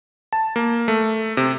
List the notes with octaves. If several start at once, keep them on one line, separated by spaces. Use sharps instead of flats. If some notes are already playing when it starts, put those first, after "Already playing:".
A5
A#3
A3
C3